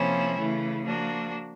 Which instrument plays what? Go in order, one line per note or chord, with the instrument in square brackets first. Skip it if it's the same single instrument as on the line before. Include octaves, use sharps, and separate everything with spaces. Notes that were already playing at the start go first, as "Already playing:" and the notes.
Already playing: [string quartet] C3 F3 A#3 C#4 E4
C#3 E3 A3
F3 A#3 D4 F#4